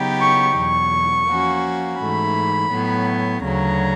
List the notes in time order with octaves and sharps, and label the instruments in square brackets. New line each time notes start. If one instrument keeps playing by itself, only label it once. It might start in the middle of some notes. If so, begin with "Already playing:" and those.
Already playing: [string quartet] C#3 F#3 B3 D#4 G4
[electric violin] C#6
[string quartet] E2 B2 F#3 [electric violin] C#6
[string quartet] F3 A#3 C#4 F#4
[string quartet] G#2 E3 A3 [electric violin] B5
[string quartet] A2 F#3 B3
[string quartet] D2 C#3 F#3 [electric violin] A#5